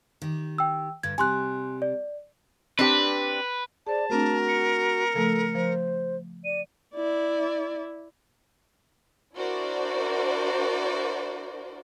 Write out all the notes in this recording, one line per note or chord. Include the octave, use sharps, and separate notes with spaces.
D#3 G4
G5 E6
G2 D3 G#6
C3 G3 G#5 C6 F#6
D5
C4 D4 G4 B4
G#4 C5 D5 A5
A3 C4 D4 F#4 A#4
C#7
C#3 F3 A3 A4
F3 C5
D5 D#7
E4 D5
D4 E4 F#4 A#4 C5 D5